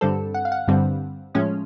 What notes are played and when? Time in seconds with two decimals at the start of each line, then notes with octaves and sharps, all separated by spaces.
0.01 G2 D3 G3 C4 A4
0.34 F#5
0.45 F5
0.52 F#5
0.68 G2 D3 G3 C4
1.35 A2 F3 G#3 C#4